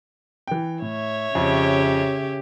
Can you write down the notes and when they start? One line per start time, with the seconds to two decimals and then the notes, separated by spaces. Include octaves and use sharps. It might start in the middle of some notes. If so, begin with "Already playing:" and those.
0.47 E3 G5
0.82 A2 C#5 E5
1.35 F2 C#3 G4